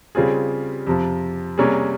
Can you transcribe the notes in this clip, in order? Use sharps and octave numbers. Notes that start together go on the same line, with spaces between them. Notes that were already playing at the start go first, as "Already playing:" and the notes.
C#3 G3 C4 F4 G#4
F2 C3 F3
C3 G3 A#3 C#4 G#4